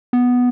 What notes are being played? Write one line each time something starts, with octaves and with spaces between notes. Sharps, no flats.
B3